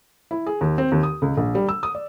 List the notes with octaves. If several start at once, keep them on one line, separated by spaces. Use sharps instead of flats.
E4
G#4
D#2
C4
D#2
D#6
C#2
A#1
G3
E6
D#6
D5